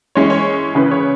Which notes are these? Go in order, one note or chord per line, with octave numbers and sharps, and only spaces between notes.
E3 G#3 C#4 E4 C#5
C#5
C#3 E3 C#4 E4 B4
C#5